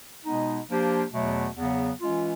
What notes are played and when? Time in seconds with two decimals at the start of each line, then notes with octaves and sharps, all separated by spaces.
0.24 B2 G#3 B3 D#4
0.68 F3 A#3 D4 G4 C5
1.13 E2 B2 F#3 A3
1.56 E2 C#3 F#3 B3
2.01 E3 G#3 C#4 F4